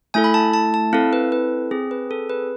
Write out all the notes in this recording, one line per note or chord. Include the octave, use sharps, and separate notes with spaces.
A3 E4 A4 G#5
B5
A5
A5
A5
C4 E4 A4 F5
B4
B4
C4 G#4
B4
A4
B4